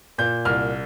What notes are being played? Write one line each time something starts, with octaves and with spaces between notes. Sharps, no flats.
A#2 G6
C2 F6